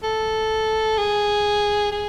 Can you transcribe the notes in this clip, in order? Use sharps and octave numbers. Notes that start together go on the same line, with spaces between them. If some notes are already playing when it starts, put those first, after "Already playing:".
A4
G#4
G#4